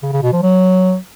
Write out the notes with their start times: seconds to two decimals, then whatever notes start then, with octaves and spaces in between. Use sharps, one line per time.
0.02 C#3
0.13 C#3
0.23 B2
0.33 F3
0.43 F#3